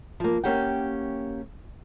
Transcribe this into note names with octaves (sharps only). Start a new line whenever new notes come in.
F3 A#3
A#3 C#4 G4 F#5 G5